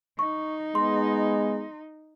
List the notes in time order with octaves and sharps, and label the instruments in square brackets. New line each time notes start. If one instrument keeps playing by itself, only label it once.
[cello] D#4 [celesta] C#6
[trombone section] G#3 B3 [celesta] C6